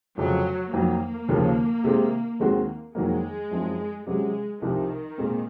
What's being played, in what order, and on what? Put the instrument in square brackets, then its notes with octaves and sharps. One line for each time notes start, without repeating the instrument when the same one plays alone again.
[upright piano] F1 F2 C#3 F3 [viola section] F#3
[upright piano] F2 D#3 F#3 [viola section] A#3
[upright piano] D#2 C#3 F3
C3 D#3 G#3 C4 D#4
D#2 D#3 G#3 C4 F#4
[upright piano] F2 D#3 F#3 A#3 [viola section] G#3
[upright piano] F#2 F3 C4 D#4
[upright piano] C3 F#3 C#4 [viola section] G#3
[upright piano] C2 C3 F3 C4 D#4 [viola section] D#3
[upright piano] A#2 G#3 C4